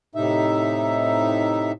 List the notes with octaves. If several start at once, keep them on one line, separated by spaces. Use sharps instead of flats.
A2 C3 D#4 E5